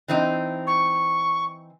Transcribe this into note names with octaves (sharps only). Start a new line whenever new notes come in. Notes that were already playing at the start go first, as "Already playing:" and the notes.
E3 C4 D#4
C#6